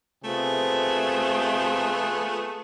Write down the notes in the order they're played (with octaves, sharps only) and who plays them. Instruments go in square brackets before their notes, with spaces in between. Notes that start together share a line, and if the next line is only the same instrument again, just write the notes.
[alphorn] C3 [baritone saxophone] A3 [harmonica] B3 F4 G#4